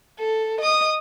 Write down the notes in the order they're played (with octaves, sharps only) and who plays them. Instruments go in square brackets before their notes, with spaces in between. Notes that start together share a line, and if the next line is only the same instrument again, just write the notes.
[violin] A4
D#5 D#6